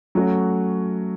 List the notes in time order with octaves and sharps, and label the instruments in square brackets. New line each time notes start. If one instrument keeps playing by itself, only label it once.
[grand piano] F#3 A3 C#4 F#4